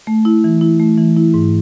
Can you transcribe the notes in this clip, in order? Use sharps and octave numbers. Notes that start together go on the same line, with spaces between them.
A3
E4
E3
E4
A3
E3
E4
G#2